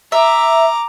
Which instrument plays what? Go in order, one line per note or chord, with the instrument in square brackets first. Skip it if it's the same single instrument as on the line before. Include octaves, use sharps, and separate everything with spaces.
[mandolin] E5 [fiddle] A#5 D6